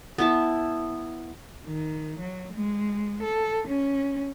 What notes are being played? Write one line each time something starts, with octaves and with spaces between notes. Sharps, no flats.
B3 E4 A5
D#3
F#3
G#3
A4
C#4